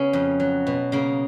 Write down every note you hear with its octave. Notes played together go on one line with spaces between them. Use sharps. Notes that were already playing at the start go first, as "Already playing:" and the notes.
Already playing: C#3 B3 C#4
F2
F#3
B2
C#3 A#3